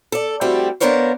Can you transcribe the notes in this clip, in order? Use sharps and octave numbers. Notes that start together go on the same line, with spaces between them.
A4 D5
G3 A3 C4 E4 F#4 G4
B3 D4 A#4 C5 C#5 F5